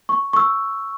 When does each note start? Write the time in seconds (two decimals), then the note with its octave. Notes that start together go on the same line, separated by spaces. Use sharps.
0.09 C#6
0.33 C#6 E6